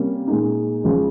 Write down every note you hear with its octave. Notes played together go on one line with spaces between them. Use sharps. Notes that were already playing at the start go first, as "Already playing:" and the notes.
Already playing: C3 G3 A#3 C#4
A#2 G#3 D#4
C#2 C#3 F3 G#3